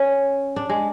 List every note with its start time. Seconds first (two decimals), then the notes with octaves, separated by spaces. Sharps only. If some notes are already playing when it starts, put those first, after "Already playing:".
Already playing: C#4
0.56 D4
0.69 G#3